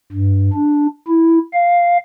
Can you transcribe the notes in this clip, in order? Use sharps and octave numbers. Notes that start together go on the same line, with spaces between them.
G2
D4
E4
F5